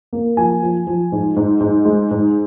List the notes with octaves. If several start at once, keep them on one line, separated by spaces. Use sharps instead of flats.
A#3
F3 G#5
F3
F3
G#2
G#2
G#2
G#3
G#2